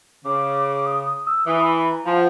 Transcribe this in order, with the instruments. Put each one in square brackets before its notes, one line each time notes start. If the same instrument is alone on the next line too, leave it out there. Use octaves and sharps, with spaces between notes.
[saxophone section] C#3 [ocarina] D6
[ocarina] D#6
D#6
E6
[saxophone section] E3 [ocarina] D#6
[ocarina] B5
B5
A#5
[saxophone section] F3 [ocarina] G#5
[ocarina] F#5